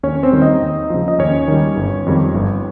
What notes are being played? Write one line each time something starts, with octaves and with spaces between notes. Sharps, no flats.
D#2 C#4 C#5
C4 C5
D#3 G3
D#4 D#5
D#2
C#3 F3
D#5
D#2 C#4 C#5
D#3 G3
G1
F2 D#3 G3
G1